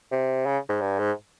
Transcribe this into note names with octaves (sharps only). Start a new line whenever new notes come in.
C3
C#3
G#2
G2
G#2